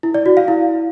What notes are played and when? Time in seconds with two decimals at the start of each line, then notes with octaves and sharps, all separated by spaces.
0.03 E4
0.14 D5
0.26 F#4
0.37 F5
0.48 E4